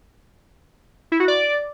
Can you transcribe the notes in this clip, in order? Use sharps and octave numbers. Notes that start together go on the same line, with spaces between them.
E4
F#4
D5